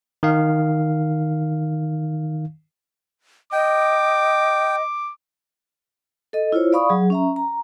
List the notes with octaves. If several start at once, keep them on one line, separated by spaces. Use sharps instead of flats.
D#3 F5
D#5 G5 D6
A4 D#5
E4 F4 C5 C#5
D5 F5 B5 C#6 D#6
F#3 G#4
C#4 E5 A#5
A#5